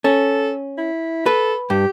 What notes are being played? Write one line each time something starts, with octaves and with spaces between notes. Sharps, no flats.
C#4 A4
E4
A4 B4
G2 G4